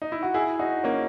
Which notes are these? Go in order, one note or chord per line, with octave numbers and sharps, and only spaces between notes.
D#4
E4
F#4
E4 G#4
D#4 F#4
A#3 C#4